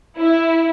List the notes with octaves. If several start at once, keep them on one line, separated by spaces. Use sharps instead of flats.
E4